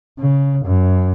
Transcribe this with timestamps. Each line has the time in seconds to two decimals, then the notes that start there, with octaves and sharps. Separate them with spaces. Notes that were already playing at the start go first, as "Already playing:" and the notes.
0.19 C#3
0.66 F#2